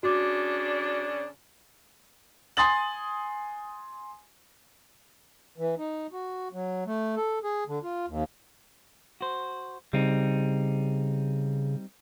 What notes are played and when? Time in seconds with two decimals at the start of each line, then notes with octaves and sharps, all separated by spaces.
0.03 C#3 D4 F#4 D6
2.57 G#5 C6 D#6 A6 F#7
5.58 E3
5.78 D#4
6.12 F#4
6.53 F#3
6.86 A3
7.16 A4
7.44 G#4
7.68 D3
7.83 F4
8.08 D#2
9.21 F#4 C5
9.93 C#3 G3 C4 D#4